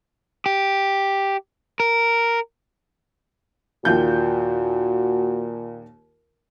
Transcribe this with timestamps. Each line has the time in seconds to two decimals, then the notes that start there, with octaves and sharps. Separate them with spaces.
0.46 G4
1.80 A#4
3.85 D#2 A#2 F4 F#4 G6